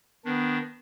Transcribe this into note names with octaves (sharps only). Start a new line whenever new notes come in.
D#3 B3 D4